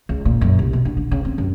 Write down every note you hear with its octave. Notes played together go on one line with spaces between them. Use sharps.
C#2
A#2
F#2
C2
B2
D3
D3
C#3
C4
F#2